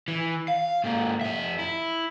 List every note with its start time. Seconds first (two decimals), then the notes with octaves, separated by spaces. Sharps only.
0.08 E3
0.48 F5
0.84 G#2 A#3
1.21 F2 E5
1.59 E4